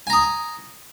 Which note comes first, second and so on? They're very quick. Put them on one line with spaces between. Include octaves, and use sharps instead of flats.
G#5 A#5 D#6